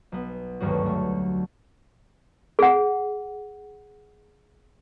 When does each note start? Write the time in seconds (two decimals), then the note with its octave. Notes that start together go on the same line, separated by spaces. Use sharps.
0.12 B1 B3
0.60 G#1 D2 G2 F#3 F#4
0.86 A3
2.59 G#4 F#5